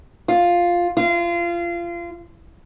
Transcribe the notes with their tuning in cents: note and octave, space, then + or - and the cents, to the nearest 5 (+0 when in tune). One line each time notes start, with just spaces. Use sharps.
F4 +5
F4 -25